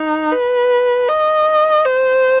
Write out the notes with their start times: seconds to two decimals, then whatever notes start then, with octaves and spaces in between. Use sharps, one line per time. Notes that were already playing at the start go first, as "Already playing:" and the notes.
Already playing: D#4
0.32 B4
1.08 D#5
1.85 C5